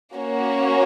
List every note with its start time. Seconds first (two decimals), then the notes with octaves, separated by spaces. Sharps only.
0.15 A#3 C#4 F#4 C#5